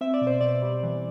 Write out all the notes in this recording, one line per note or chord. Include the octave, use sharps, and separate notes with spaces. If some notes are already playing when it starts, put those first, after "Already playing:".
C4 E5
D5
B2
C5
B2 D5
G3
E3